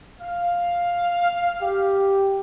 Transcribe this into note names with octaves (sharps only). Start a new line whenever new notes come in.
F5
G4